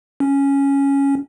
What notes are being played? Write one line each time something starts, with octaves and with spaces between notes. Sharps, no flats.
C#4